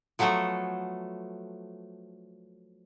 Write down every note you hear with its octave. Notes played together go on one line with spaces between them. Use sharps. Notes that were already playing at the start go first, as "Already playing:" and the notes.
F3 F#3 A3 B3 A4